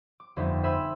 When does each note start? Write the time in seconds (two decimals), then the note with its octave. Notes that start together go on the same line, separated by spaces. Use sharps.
0.20 D6
0.36 G1 F2 G3 D#4 E5
0.63 C5 E5 G#5 B5 E6